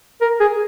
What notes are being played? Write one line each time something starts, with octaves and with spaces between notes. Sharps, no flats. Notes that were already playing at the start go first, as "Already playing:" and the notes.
A#4
G#4